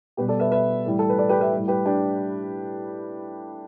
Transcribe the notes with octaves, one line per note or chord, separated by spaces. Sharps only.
B2 G3 G4 B4
A4 D5
B4 E5
B4 E5
A2 E3 G3
A4
B4
A4 D5
G4 B4
B4 E5
A2 G3
G4 B4
D4 G4